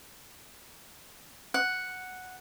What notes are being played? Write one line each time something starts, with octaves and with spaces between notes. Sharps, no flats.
F#5